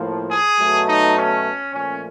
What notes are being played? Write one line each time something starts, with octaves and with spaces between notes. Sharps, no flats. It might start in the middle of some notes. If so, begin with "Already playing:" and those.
Already playing: A2 F3 A#3
G#4
B2 F#3 A3
D#4
C#4
A#2 F3 A3 C#4